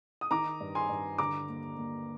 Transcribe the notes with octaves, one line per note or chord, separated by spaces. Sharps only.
D#6
D#3 A#5 D6
G2
G#5 C6
G2
D3 A#5 D6
D#2
D#2